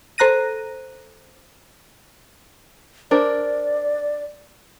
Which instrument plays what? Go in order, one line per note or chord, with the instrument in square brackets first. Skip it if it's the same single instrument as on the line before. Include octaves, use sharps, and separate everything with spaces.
[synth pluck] A4 C5 A#5 F#6 A#6 D#7
[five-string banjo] D4 A#4 C5 [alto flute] D5